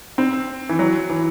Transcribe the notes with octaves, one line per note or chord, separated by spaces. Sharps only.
C4
E3
F#3
E3